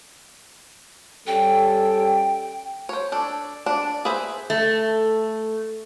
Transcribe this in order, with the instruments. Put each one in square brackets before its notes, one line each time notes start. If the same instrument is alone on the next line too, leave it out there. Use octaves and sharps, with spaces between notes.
[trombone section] G3 C#4 A4 [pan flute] G5
[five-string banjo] C5 C#5
D4 A4
D4
G#4 B4 C5 E5
[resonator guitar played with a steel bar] A3